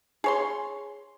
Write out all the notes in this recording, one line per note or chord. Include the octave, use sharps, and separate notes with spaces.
G#4 C#5 C6